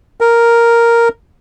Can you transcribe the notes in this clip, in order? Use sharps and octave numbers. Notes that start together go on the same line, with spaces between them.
A#4